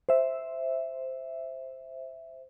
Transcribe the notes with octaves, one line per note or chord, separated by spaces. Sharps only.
C5 E5